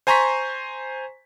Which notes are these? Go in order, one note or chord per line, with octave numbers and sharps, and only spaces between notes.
C5 G#5 A#5 C6 C#6 B6